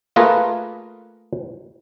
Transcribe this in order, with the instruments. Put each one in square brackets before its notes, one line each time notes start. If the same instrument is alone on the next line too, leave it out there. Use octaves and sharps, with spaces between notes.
[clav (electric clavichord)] A3 A#3 F4 G#4 A#4 B4